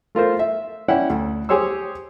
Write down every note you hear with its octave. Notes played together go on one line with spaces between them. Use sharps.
A3 F4 A#4 C5
E5
C#4 E4 D5 F#5 G5
D2
G4 G#4 C5 C#5 C6 E6